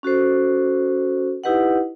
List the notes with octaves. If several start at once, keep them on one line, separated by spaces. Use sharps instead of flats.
C#4 F#4 A4 C5
D#4 E4 G4 B4 D#5 F#5